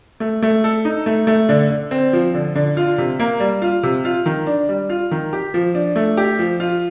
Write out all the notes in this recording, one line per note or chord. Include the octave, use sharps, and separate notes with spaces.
A3
A3
A4
D#4
A3
A3
D3
D3
C4
F3
D3
D3
F4
C3
A#3
G3
F4
C3
F4
D#3
D4
G3
F4
D#3
G4
F3
D4
A3
G4
F3
F4